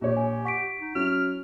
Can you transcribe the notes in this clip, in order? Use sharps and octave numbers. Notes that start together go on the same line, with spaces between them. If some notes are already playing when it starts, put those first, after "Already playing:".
A#1 G4 C#5
G#5
F#5 C#6 B6 D7
D#4
F#3 C#4 E4 F6